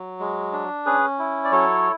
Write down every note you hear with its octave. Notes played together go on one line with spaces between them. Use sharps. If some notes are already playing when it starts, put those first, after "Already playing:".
Already playing: F#3
G#3
D4
C#4 G#4 B4
E4
D5
F#3 A4 C#5